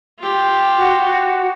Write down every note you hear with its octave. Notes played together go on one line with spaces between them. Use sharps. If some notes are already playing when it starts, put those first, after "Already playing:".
F4 G4
F#4